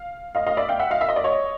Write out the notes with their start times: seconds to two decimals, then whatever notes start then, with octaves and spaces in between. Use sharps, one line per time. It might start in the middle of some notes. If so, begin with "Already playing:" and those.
Already playing: F5
0.35 D#5 F5
0.47 D#5 F5
0.57 D5 E5
0.69 F5 G5
0.79 E5 F#5
0.91 D#5 F5
1.01 E5
1.09 D#5
1.16 D5
1.24 C#5 D#5